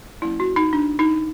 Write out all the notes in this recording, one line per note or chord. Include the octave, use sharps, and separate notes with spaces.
F#3 A#3 C#4 E4
F#4
D#4
D4
D#4